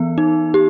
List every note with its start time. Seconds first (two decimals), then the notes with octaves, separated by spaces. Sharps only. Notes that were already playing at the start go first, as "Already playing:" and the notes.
Already playing: E3 B3
0.18 D#4
0.54 G4